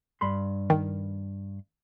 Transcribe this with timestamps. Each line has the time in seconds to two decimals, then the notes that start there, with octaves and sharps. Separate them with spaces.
0.21 G2 B5 C6
0.70 D#3